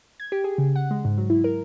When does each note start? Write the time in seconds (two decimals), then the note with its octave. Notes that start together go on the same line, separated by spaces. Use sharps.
0.20 G#6
0.32 G4
0.44 G#4
0.58 C#3
0.75 F#5
0.91 G#3
1.05 G#2
1.18 F#3
1.30 E4
1.44 A#4